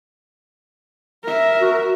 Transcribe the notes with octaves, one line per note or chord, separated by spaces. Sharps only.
A#4 E5
F#4